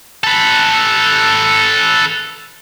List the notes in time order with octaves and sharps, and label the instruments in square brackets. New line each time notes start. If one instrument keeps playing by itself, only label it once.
[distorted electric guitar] A4 B4